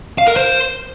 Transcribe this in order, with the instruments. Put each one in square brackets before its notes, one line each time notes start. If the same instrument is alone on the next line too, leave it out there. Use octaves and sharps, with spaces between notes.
[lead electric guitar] F5
A#4
C5